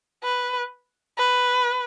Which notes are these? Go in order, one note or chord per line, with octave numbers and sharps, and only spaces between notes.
B4
B4